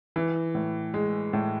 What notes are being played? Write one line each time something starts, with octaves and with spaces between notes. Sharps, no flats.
E3
A2
G#3
A2